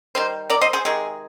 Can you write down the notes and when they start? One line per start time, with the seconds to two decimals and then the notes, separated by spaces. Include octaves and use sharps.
0.15 D#3 G3 C5
0.50 A#4 D5
0.61 C5 D#5
0.73 G#4 C5
0.85 C3 D#3 G#3 G#4